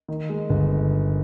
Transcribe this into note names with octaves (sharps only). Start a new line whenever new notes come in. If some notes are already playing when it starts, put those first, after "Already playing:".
D#3
G#3
G1